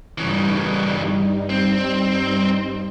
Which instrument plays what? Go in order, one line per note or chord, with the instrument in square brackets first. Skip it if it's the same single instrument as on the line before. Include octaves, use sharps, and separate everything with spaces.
[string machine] G2 G3 D#4 [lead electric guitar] C#3 E3
[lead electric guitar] C4